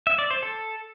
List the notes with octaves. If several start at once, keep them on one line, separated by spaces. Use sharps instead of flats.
E5
D5
C5
A4